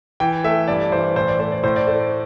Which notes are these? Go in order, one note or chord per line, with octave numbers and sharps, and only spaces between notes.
E3 G5
A3 E5
G2 D5
E3 C5
A2 C5
D5
A3 C5
D5
A2 C5
D5
A3 C5